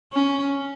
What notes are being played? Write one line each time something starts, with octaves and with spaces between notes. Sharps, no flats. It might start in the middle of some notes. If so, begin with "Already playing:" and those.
C#4